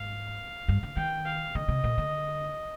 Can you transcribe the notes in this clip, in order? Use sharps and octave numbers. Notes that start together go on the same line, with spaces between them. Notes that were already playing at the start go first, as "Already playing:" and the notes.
Already playing: G#2 F5
G2
D3
D#3 G5
F5
D3 D#5
C3
A#2
D3